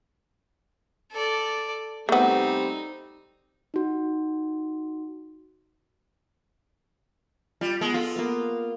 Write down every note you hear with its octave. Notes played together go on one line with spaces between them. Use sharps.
A4 D5
G3 A3 B3 C4 D#4
D#4 F#4
G3 F4
G#3 B3
F4 A4 B5
A#3 B3